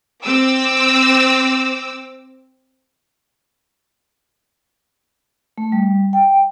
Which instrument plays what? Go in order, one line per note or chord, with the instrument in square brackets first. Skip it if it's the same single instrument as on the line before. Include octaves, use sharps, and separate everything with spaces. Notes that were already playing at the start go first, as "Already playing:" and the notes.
[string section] C4 D6 E6
[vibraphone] A3
G3
G5